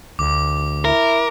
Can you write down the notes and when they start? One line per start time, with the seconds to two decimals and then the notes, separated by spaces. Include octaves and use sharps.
0.19 D2 D6
0.85 E4 A#4